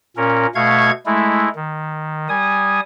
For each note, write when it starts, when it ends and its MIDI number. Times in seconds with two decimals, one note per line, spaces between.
0.17 0.46 46
0.17 0.46 61
0.17 0.46 70
0.55 0.91 47
0.55 0.91 57
0.55 0.91 77
0.55 0.91 85
0.55 0.91 92
1.06 1.49 56
1.06 1.49 57
1.06 1.49 64
1.56 2.28 51
2.29 2.80 55
2.29 2.80 80
2.29 2.80 87